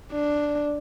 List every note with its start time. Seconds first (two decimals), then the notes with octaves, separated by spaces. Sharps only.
0.11 D4